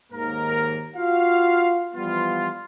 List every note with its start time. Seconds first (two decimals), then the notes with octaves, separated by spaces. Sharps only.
0.12 D#2 G#2 D#3 A#3 A#4
0.96 F4 F#4 F5
1.95 E3 F3 G3 B3 F4